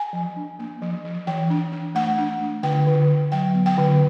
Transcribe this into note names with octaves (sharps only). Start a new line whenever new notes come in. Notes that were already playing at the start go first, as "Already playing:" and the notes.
Already playing: G#5
F3
D4
A#3
F3
F3
E3 G5
D4
D4
A3 F#5
D4
A3
D3 G5
D3
D3
F#3 G5
B3
G5
D3